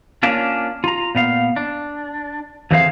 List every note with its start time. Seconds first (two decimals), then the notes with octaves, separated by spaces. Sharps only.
0.23 A#3 C#4 D4 F4
0.84 F4 A#5
1.15 A#2 B3 F5
1.56 D4
2.71 F2 D3 E3 G#4 C5 F5